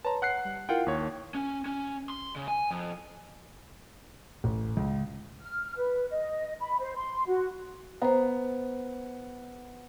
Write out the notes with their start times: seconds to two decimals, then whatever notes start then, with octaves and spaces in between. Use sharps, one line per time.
0.05 B4 C#5 A5 A#5 C6
0.22 F#5 F#6 C7
0.45 G3
0.69 E4 F4 A#4 F#5 G5
0.86 D#2 C#5
1.35 C#4
1.66 C#4
2.10 C6
2.36 C#3
2.48 G#5
2.71 F2
4.44 A1
4.77 C#2
5.42 F6
5.77 B4
6.10 D#5
6.60 B5
6.81 C5
6.95 C6
7.27 F#4
8.02 B3 C5 A#5